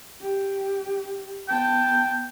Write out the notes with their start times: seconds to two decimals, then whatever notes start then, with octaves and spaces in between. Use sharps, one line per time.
0.21 G4
1.49 B3 G5 A5